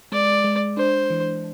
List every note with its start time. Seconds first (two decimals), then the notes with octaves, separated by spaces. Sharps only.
0.12 G#3 D5
0.44 G#3
0.77 D4 C5
1.10 E3